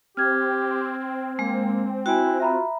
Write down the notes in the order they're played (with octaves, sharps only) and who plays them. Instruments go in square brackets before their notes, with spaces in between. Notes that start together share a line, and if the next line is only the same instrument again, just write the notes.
[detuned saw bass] C4 [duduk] G4 [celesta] F6 G#6
[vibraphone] G#3 [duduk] A#3
[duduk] E4 [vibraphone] F#4 [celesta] G5 G#5
[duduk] F4 [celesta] E5 A#5 B5